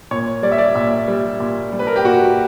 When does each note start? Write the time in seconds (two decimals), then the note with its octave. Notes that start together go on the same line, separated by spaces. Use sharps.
0.11 A#2 C#5
0.43 G3 D5
0.52 E5
0.58 D5
0.75 A#2 E5
1.08 G3
1.40 A#2
1.72 G3
1.79 B4
1.87 A#4
1.96 G4
2.04 A#2 F#4